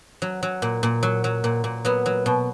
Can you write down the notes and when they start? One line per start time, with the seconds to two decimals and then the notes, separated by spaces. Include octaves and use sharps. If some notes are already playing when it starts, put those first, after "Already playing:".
0.22 F#3
0.43 F#3
0.62 A#2
0.83 A#2
1.03 F#3
1.24 F#3
1.44 A#2
1.64 A#2
1.85 F#3 B3
2.06 F#3
2.26 B2